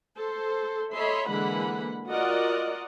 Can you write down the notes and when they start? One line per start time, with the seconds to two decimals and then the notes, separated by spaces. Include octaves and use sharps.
0.17 A4 C5
0.94 A4 C#5 D#5 E5 B5 C6
1.29 D3 E3 G#3 A#3 F#5 B5
2.10 F4 F#4 A#4 D5 D#5 F#5